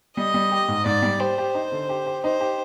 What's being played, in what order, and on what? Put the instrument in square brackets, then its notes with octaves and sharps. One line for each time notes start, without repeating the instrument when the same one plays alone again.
[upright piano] G3 [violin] D#5
[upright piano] G3
G4
G#2
[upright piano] G#2 [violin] D5
[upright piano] G3
[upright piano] G4 [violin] C5
[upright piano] G4
D#4
D3
G4
G4
[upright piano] D#4 [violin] C5
[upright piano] G4